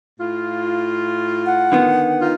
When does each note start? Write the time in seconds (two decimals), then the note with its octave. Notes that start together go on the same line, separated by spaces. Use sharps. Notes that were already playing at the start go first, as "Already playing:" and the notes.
0.19 A2 F4
1.46 F#5
1.72 D3 D#3 B3
2.21 D#4 F4